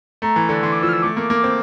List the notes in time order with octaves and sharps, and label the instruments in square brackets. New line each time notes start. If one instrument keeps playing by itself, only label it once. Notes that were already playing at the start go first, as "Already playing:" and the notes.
[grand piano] A3 [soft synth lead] A#5
[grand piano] E3
D3
[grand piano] E3 [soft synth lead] C6
[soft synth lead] D6
[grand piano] F3 [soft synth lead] E6
[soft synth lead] F6
E6
[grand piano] A3 [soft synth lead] D6
[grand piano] A#3
A#3
C4